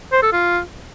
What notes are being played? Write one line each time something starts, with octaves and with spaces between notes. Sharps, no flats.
C5
A4
F4